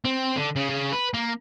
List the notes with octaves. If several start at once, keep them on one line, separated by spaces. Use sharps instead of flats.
C4
D3
C#3
C#3
B4
A#3